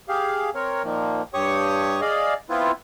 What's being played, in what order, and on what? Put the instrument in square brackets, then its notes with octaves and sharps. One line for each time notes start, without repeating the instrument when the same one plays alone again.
[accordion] G4 G#4 F5
C4 A#4 C#5
A#2 D#3 F3 A#3
G2 G4 C#5 C#6 D#6
G#4 D5 D#5 F5
B3 C4 E4 F4 B4